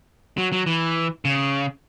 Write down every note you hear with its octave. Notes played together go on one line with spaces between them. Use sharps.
F#3
F#3
E3
C#3